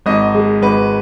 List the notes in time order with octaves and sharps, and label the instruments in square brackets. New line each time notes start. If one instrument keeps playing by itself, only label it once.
[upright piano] G#1 D#5
G#3
G#1 B4